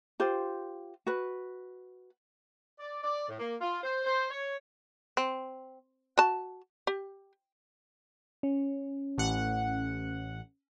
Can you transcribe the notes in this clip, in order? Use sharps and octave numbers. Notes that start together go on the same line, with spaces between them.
F4 G4 C5
F#4 B4
D5
D5
A2
A#3
F4
C5
C5
C#5
C4
F#4 A5
G4
C#4
A1 F#5